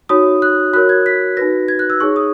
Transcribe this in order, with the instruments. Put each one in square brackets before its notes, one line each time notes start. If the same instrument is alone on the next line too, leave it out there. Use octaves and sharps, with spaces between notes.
[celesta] D#4 F#4 C#5 D#6
F#6
F#4 A#4 C#5 F#6
G#6
B6
D#4 F#4 B4 A#6
G#6
F#6
E6
D#4 G#4 C#5 C#6
D#6